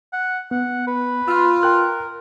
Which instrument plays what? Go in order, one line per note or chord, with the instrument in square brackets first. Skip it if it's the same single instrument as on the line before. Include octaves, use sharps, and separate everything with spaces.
[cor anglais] F#5
[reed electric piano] B3 [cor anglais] F#5
[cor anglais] B4
[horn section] F4 [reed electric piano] E6
[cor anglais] A#4 [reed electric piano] G5 F#6